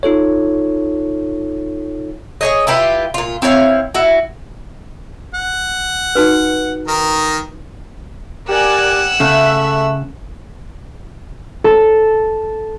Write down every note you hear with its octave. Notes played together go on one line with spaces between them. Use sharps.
D#4 F4 A4 C#5
G#4 C#5 D#5
E4 F4 G4 B4
A#2 F4
C4 E4 C#5 F5
E4 F#4
F#5
D#4 F#4 B4
D#3 A#4
G4 A#4 D5 F#5 G#5 E6 F#6
C#3 A3 E5
A4